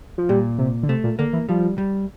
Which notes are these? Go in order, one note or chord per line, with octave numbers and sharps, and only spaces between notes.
F3
A#2 G3
C3
D3
C3 A3
A#2
D3 A#3
E3
F3 G3
G3